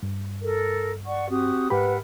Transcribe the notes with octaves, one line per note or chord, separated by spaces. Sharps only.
G2
A4 A#4
D5 F#5 C#6
C4 F#4 G4 D#6
G#2 G4 A#4 B4 E5 F#5 B5